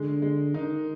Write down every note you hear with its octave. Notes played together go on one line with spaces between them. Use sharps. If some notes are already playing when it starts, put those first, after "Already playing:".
Already playing: D3 G#3
G#3
D#3 D#4